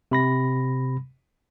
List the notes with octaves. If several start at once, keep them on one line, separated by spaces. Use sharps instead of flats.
C3 B5 A#6